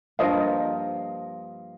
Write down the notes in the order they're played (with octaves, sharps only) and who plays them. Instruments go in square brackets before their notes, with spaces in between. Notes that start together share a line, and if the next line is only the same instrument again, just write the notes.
[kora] G2 F3 A#3 [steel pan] D#5 F5